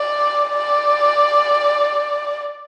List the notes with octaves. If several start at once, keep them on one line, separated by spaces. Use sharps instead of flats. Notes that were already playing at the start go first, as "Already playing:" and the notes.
Already playing: D5
D5